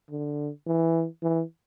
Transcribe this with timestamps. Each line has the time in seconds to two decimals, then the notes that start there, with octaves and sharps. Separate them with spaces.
0.10 D3
0.67 E3
1.23 E3